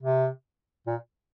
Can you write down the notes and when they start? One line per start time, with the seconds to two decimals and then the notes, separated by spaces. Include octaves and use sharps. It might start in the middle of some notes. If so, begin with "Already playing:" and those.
0.03 C3
0.87 A#2